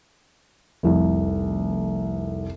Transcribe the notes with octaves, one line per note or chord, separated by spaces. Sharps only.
F1 C2